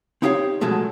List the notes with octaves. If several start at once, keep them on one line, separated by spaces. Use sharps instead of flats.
C4 D#4 E4 G4 C#5 F5
B2 F3 F#3 G#3 A3